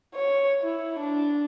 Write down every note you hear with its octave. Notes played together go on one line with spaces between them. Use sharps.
C#5
E4
D4